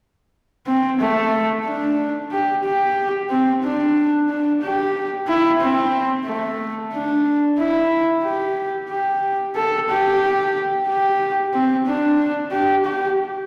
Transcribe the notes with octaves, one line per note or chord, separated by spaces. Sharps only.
C4
A3
D4
G4
G4
C4
D4
D4
G4
E4
C4
A3
D4
E4
G4
G4
A4
G4
G4
C4
D4
G4
G4